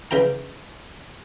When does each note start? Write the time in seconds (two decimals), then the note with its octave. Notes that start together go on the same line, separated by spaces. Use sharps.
0.11 C#3 E3 G5 A#5